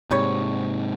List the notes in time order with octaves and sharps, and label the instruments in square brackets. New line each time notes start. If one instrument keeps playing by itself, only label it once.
[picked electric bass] G#2 C3 [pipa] D#3 G3 C#5